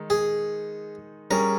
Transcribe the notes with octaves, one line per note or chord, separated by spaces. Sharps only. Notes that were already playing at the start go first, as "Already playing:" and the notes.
Already playing: D#3 G#3 D#4
G#4
G3 C#4 G#4 A#4 C#5